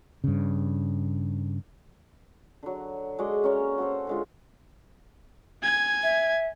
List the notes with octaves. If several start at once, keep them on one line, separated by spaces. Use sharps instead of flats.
G2 C#3
D3 F#3
G#3 F#4 D5 D#5
C#4 A#4 C#5
A#3
F#4 A4 C5
D3 G#3 F4
G#5 G#6
E5